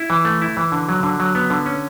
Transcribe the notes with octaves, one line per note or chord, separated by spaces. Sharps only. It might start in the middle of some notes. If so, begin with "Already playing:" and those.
Already playing: E4
E3
A3
E4
E3
D3
F#3
D3
F#3
B3
D3
C#4